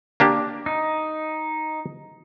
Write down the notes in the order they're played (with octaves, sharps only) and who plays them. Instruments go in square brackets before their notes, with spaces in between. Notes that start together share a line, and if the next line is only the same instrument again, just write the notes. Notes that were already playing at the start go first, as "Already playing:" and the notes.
[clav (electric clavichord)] A#3 D4 G4
[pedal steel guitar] D#4